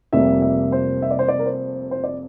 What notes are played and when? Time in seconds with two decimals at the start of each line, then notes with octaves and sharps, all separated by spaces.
0.13 F1 F2 C3 G3 A#3 E5
0.42 E5
0.72 C5
1.02 E5
1.11 D5
1.19 C5
1.28 D5
1.39 A#4
1.46 C5
1.91 C5
2.04 D5